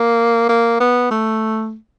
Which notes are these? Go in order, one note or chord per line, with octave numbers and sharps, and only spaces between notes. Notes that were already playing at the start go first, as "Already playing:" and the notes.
Already playing: A#3
A#3
B3
A3